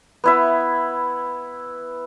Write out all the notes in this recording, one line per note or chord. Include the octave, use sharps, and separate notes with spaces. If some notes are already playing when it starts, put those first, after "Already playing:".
B3 E4 E5